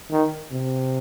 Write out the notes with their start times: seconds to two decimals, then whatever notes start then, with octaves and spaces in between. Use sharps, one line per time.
0.11 D#3
0.51 C3